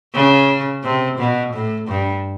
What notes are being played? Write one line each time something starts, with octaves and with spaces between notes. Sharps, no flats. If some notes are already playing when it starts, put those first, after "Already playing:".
C#3
C3
B2
A2
G2